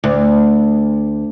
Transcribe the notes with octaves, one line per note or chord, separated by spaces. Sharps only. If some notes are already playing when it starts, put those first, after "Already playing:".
D2